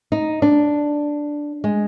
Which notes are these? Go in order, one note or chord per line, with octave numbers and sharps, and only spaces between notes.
D#4
D4
G#3